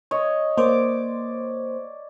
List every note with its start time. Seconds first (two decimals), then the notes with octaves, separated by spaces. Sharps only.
0.11 C#5 D#5
0.57 A#3 C5 D5 D6